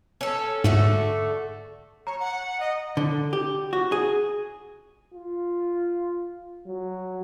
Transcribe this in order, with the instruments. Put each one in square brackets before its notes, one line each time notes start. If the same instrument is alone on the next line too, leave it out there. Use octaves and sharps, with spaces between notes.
[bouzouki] C#4 A4
[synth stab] G#2 [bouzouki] D3 A3 F#4
[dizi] C#5 [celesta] A#5
[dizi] F#5
D#5
[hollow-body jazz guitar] D3
G4
F#4
G#4
[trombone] F4
F#3